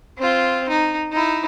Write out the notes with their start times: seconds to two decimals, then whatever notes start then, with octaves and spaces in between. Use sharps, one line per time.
0.18 C4 F4
0.69 D#4
1.12 D#4 E4